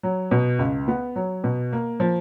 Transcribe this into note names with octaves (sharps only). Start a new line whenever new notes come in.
F#3
B2
C#2
B3
F#3
B2
A#3
F3